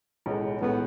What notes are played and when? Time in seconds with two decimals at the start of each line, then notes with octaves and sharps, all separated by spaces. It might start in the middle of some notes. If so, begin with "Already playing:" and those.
0.26 B1 A2 G#3
0.61 B1 A2 G#3 B3